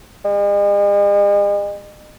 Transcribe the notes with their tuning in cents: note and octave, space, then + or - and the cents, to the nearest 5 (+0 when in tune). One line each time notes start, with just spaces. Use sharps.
G#3 -45